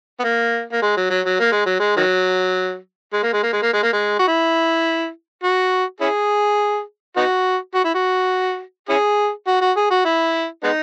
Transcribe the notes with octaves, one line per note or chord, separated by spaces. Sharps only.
B3
A#3
A#3
G#3
F#3
F#3
F#3
A#3
G#3
F#3
G#3
D#3 F#3
G#3
A#3
G#3
A#3
G#3
A#3
G#3
A#3
G#3
F#4
E4
F#4
C#4 E4 G#4
B3 D#4 F#4
F#4
E4
F#4
C#4 E4 G#4
F#4
F#4
G#4
F#4
E4
G#3 B3 D#4